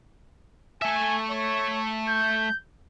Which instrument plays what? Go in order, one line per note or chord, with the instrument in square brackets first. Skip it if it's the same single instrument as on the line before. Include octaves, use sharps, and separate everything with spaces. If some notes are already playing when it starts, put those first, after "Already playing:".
[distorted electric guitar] A3 E5 [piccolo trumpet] G#5
[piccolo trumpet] C#5
G6